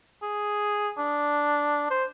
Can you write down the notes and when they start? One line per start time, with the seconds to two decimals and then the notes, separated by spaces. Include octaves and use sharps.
0.22 G#4
0.97 D4
1.90 C5